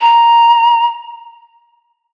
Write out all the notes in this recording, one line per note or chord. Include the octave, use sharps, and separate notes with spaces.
A#5